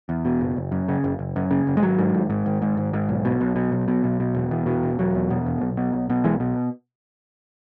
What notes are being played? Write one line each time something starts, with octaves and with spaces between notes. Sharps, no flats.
E2
B2
F#1
F#1
F#2
C#3
F#1
F#1
F#2
C#3
F#1
G#3
G#1 F#3
G#2
G#1
G#2
G#1
G#2
G#1
G#2
B1
B2
B1
B2
B1
B2
B1
B2
E1
E2
B2
E1
E1 F#3
E2
B2
E1
B1
B2
B1
B2
B1 E3 G#3
B2